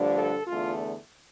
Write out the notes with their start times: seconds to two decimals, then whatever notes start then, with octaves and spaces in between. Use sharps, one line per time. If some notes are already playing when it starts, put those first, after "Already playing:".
Already playing: G2 D3 F3 A3 D4
0.17 A4
0.47 E2 D3 A3 F4